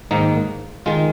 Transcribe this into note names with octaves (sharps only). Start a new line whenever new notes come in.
G#2 D#3 A#3 D#4
D#3 G#3 F4